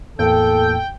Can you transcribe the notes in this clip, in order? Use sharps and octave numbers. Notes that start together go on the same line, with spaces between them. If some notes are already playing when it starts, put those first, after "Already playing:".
E2 A2 A#3 A4 G5